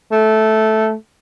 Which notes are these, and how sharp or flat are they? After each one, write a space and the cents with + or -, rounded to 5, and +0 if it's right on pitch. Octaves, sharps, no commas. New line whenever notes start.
A3 -10